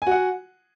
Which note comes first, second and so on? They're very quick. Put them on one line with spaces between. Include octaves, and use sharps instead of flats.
G#5 F#4 F#5